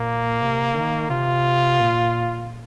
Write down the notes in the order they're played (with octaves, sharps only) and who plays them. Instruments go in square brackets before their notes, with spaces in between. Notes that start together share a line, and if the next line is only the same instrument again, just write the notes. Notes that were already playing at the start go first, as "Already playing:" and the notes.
Already playing: [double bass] A#2 [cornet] A#3
[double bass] C3
D#3
[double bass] C3 [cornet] F4
[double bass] A#2